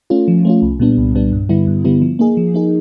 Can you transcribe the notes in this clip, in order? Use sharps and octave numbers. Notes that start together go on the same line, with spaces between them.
A3 C#4 F4
F3
A3 C#4 F4
C2
A#2 G3 B3 D4
C2
A#2 G3 B3 D4
G2
D3 G3 B3 E4
G2
D3 G3 B3 E4
F3
A#3 D#4 G#4
F3
A#3 D#4 G#4